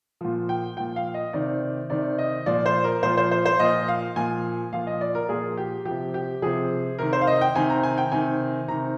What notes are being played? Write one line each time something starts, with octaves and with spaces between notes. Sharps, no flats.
A#2 F3
G5
A#2 F3 G5
F5
D#5
C3 D#3 D5
C3 D#3 D5
D#5
A#2 F3 D5
C5
A#4
A#2 F3 C5
C5
C5
C5
A#2 F3 D#5
F5
A#2 F3 G#5
A#2 F3 F5
D#5
D5
A#4
A#2 F3 G#4
G4
F3 G4
C3
G4
C3 F3 G#4
C3 D#3 A#4
C5
F5
D#5
G5
C3 D#3 G#5
A#5
G#5
G5
C3 D#3 G#5
C3 D#3 A#5